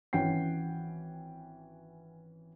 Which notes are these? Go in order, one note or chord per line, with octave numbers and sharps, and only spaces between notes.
G#1 E3 C#4 F#5 G5 C7